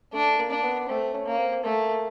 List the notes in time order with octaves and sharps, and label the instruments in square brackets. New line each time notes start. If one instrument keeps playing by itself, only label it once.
[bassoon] A3 [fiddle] D4
[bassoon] A#3
[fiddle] D4
[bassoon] B3
[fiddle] A3 [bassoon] C4
[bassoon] C#4
[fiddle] A#3
[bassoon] C4
[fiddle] A3 [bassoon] A#3